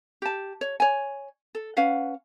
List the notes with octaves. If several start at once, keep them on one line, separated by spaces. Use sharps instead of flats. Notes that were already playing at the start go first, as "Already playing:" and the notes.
G4 A5
C#5
C#5 G#5
A4
C#4 B4 F5 F#5